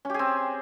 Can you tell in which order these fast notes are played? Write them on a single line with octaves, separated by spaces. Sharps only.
C#4 G4 G#4 C4